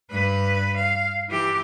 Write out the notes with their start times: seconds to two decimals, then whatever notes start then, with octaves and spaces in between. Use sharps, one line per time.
0.11 G2 B4
0.76 F5
1.29 E3 G4